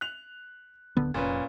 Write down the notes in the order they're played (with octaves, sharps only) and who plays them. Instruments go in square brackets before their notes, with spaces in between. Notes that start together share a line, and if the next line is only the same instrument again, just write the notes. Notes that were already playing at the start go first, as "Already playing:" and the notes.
[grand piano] F#6 F7
[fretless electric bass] D1 D3 B3
[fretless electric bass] F1 [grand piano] A#2 C#4 B4